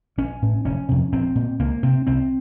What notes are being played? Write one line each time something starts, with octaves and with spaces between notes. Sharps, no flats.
A#1 C#4
A2
F1 C#4
F2 C3
A#1 C4
A#2
C#2 A#3
C3 C4
C2 C4